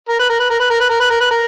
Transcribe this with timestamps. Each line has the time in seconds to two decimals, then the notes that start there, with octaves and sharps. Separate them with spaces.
0.09 A#4
0.19 B4
0.30 A#4
0.40 B4
0.50 A#4
0.60 B4
0.70 A#4
0.80 B4
0.90 A#4
1.00 B4
1.11 A#4
1.21 B4
1.31 A#4